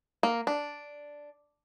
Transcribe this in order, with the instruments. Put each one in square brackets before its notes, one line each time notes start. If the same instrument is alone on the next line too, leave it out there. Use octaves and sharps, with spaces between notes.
[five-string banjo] A#3
D4